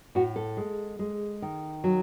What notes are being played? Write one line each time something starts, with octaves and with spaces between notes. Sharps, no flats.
A2 F#4
A4
G#3
G#3
D#3
F#3